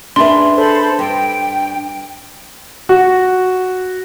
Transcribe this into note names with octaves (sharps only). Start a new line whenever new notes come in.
D4 G#4 B4 E5 C6
A4 C5 B5
G2 G5
F#4